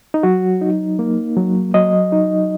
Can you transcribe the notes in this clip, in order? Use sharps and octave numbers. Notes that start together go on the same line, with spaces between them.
D#4
F#3 F#4
D#4
A#3
F#3
F#3 D#5
D#4